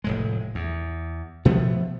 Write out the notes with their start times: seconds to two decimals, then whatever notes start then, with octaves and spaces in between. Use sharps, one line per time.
0.04 F1 A2 G#3
0.55 E2
1.45 B2 F3 A3 B3